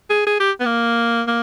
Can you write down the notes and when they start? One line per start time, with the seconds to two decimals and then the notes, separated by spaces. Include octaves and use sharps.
0.10 G#4
0.27 G#4
0.40 G4
0.60 B3
0.65 A#3
1.28 A#3